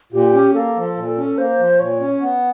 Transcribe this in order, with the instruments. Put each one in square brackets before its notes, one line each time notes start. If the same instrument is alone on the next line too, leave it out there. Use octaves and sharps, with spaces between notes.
[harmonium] A#2 [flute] G4
[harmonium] C#4
[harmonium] A#3 [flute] A4
[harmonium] F3
A#2
C#4
[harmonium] A#3 [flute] C5
[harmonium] F3
[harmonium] A#2 [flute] C#5
[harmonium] C#4
B3